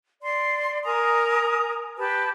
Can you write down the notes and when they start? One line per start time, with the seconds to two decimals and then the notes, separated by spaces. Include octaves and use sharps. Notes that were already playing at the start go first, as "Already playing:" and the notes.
0.21 D5 C6
0.84 A#4 G#5 A#5 D#6
1.98 G4 B4 A5